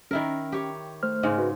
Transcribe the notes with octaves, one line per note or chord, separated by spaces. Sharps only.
D#3 C#4 E4 A#4
G4 C#5
A3 C5 F6
G#2 C#3 G#3
F#4 B4